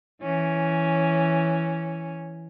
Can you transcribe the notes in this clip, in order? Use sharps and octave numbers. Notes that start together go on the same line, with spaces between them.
E3 C#4